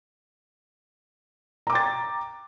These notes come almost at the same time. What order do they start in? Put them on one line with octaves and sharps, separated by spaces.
A#5 D6 G5 A6